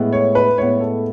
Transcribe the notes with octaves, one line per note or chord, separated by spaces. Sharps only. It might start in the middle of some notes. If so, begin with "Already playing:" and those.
Already playing: A2 G#3 B3
C#5
B4
A2 G#3 B3 C#5
A4